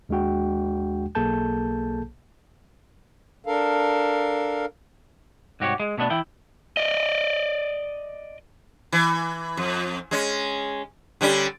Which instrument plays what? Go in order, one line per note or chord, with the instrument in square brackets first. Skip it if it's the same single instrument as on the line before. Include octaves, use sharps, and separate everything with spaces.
[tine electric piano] D#2 G#3 D4 F#4 G5
B1 A#3 G#4 A4 A5 G6
[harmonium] D4 A4 A#4 F5
[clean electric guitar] C2 G#2 F#4 G4 C#5
G#3
B2 A3 B3 D4
E3 E4 G5
[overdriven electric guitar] D5 D#5
[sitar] E3
F2
G#3 C#4
D3 G3 C#4